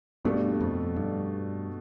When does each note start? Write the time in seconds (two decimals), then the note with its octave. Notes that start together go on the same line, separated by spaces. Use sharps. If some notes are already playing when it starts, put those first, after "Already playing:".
0.25 G2 B2 A3 D4 A4
0.61 F2
0.96 G2